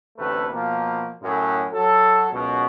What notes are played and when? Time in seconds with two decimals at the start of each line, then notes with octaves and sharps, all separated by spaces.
0.18 A1 D2 C3 A3 B4
0.51 B2 F3 A#3
1.23 F#2 A2
1.74 F#3 A4
2.32 C#2 F#2 B2